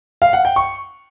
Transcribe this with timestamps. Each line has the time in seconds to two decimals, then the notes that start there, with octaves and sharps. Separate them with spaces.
0.22 F5
0.33 F#5
0.45 G5
0.56 C#6